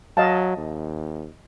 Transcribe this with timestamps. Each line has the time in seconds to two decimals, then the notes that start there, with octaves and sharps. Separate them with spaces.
0.17 F#3 D#5 F5 A5
0.57 D#2